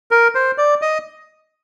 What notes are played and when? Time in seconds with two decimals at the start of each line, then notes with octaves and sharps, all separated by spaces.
0.11 A#4
0.35 C5
0.58 D5
0.82 D#5